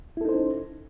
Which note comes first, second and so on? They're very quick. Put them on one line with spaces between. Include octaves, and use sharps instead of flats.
E4 A4 D#4 C5 C#4